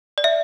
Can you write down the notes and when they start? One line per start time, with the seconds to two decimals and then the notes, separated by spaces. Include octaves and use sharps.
0.18 D5
0.24 E5